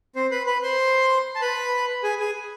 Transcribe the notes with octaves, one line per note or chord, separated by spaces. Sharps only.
C4 C5
B4 B5
B4 B5
C5 C6
A5
B4 B5
G#4 G#5
G#4 G#5